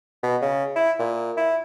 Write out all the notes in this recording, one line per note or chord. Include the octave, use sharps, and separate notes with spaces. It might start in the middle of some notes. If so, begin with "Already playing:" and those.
B2
C#3
E4
A#2
E4